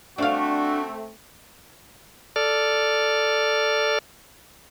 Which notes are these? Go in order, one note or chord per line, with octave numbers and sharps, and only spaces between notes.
A3 C4 D4 F#4 F5
A4 D5 F6